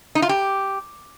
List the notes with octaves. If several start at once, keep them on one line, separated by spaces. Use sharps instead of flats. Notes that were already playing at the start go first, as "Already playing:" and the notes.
D#4
F4
G4